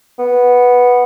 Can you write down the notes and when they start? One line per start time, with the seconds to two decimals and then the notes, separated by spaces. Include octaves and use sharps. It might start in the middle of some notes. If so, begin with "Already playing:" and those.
0.19 B3